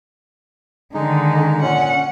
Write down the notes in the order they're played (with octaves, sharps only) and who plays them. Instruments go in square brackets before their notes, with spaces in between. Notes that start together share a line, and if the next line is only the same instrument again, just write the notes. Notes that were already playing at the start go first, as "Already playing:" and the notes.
[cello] D3 D#3 [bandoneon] G#3 D#4
[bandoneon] A#2 C#4 [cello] F#5